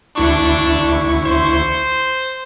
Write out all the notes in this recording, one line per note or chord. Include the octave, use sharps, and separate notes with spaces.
D2 D4 E4 C#6
C5